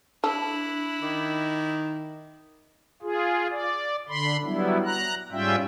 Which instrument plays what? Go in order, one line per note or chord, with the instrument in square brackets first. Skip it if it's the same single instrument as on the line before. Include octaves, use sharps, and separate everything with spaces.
[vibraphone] D4 [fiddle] E4 F#6 [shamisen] A4
[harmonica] D#3 [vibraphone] D6
[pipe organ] F4 G#4
D5
D3 B5 C6
F#3 G3 B3 E4
A#5 F#6
G#2 G3 C#4 F4 E5 G5